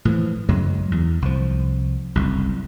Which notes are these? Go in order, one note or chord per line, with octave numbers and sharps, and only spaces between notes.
A2 E3 F3
F#2 C#3 F#3 G#3
E2
C2 F3
F#1 C2